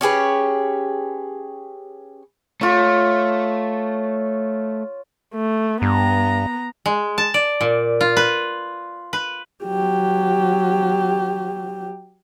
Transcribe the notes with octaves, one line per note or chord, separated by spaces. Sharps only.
C#4 G4 G#4 B4
A3 F4 C#5
A3
G2 B3 A#5
G#3
A5
D5
A#2
F4
B4
B4
F#3 G4